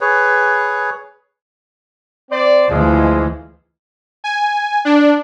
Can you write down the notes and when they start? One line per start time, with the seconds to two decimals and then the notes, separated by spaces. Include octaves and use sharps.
0.01 G#4 B4 C#5
2.31 C4 C5 D5
2.69 D2 E3 F3 G#3
4.24 G#5
4.85 D4